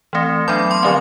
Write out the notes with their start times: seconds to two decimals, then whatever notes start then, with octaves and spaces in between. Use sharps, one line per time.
0.13 E3 A3 C4
0.48 F#3 B3 D4 B5
0.71 C6
0.82 D3 F3 A3 C4 C6